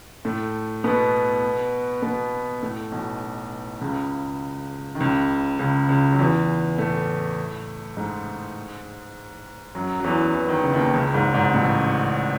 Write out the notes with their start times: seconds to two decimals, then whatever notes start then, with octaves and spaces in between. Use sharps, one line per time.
0.25 A2 A3
0.84 B2 B3
2.02 B2 B3
2.62 A2 A3
2.92 B1 B2
3.81 C#2 C#3
4.95 D#3
5.00 C#2 C#3
5.59 C#2 C#3
5.89 C#2 C#3
6.12 F#3
6.19 E2 E3
6.78 A2 A3
7.97 G#2 G#3
9.75 F#2 F#3
10.00 F#3
10.04 E2 E3
10.34 E3
10.48 D#3
10.61 C#3
10.74 D#2 D#3
10.93 C#2 C#3
11.14 G#1 G#2
11.34 G#1 G#2
11.54 A1 A2